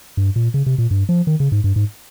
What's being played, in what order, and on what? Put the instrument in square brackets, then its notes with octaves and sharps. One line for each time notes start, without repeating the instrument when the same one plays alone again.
[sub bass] G2
A#2
C#3
C3
A#2
G2
F3
D#3
C#3
G#2
G2
G#2